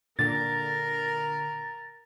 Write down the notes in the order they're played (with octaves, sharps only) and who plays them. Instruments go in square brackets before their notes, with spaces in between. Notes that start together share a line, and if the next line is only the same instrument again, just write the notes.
[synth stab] A#2 D3 [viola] A#4 A#5 [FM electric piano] A6